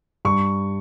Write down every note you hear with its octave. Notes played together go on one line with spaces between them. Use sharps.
G2 C#6